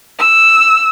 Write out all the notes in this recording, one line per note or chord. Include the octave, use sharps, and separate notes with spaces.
E6